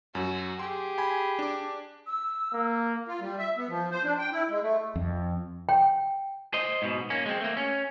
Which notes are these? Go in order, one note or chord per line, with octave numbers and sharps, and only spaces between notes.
F#2 F#3 F#4
G4 G#4 C6
G#5 B5 G#6
D4 D6
E6
A#3
F4
G3
E5
B3
F3
C5
D4
G5
E4
G#3
A3
F2
G5
C5 D#5
G#2 B2
A#3 C#4
G#3 C4
A3 A#3
C#4